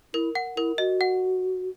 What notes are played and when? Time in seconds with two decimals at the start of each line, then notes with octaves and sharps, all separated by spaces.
0.14 E4 A#4
0.35 F#5
0.57 E4 A#4
0.78 F#4 D#5
1.01 F#5